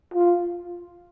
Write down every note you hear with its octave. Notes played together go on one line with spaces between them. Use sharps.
F4